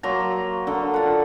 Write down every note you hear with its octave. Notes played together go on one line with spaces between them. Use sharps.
F#3 A#3 A#5 C6
D3 A4 A#4
F4 F#5